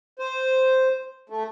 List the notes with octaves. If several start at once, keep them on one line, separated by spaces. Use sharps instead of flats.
C5
A3